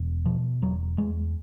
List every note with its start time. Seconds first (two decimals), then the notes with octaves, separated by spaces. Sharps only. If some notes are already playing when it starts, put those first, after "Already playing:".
Already playing: E1
0.25 B2 F3
0.62 E1 F#3
0.98 E2 G#3